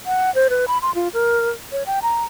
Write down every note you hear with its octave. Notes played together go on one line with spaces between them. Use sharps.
F#5
C5
B4
B5
C6
F4
A#4
C#5
G5
A#5